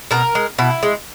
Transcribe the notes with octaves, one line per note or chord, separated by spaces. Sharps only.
B2 A#4
G#3
B2 E4
G#3